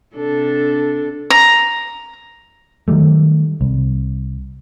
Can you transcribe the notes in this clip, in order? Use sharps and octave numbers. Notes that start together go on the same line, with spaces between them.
C3 D4 A4
A#5
D#3 F#3 G3 A3
C2